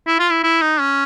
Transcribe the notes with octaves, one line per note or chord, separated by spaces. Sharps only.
E4
F4
E4
E4
D#4
C#4